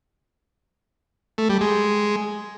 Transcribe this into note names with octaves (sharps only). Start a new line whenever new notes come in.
A3
G3
G#3